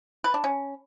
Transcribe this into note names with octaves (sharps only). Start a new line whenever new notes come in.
B4
D4
C#4